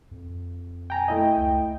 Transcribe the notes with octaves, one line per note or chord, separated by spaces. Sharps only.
F2
G5 G#5 A#5
A3 E4 D#5 G5
C#2